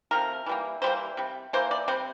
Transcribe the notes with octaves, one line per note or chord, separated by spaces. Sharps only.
C3 F3 A3 A#4
E3 G3 A#3
E3 G3 A#3 C5
C3 G3
E3 A#3 C5
D5
C3 G3 C5